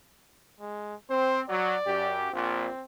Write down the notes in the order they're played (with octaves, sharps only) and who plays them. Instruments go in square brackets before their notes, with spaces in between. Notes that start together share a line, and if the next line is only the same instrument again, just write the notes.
[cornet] G#3
[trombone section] C4 [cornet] C5
[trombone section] F#3 [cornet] D5
[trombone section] F#2 G4
[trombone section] A#1 A#2 [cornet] C4